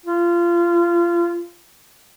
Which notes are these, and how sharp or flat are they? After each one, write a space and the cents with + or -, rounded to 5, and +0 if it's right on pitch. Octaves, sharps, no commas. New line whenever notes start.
F4 -25